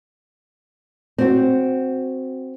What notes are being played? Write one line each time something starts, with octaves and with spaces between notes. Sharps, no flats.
C4 F#4